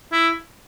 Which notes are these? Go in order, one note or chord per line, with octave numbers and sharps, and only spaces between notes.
E4